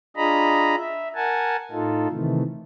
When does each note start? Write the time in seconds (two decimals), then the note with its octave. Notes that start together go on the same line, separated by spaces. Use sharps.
0.16 D4 F4 G#4 D#5 A#5 B5
0.78 E5
1.15 A#4 F#5 G#5 A5
1.71 A2 D#4 F4 A4
2.10 C3 D#3 E3 A3